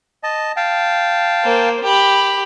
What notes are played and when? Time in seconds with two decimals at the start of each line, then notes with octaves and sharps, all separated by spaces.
0.23 D#5 A5
0.57 F5 G5 A5
1.43 A#3 C5
1.84 G4 B5